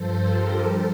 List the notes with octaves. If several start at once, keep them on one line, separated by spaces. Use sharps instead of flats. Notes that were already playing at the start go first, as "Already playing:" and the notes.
Already playing: G2 F3 A4 C5
G4 A#4
G3 A4 C5